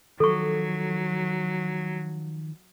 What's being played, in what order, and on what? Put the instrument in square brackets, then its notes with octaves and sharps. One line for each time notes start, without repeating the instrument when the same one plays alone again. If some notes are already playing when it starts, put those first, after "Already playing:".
[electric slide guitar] D#3 F3 [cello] F#3 [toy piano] A4 C#6